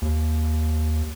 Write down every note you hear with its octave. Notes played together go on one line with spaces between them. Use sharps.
D#2